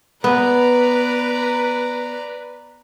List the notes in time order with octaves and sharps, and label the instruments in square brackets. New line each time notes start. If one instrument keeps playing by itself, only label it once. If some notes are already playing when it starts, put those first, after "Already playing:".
[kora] B3 [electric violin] B4 [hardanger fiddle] D5 A#5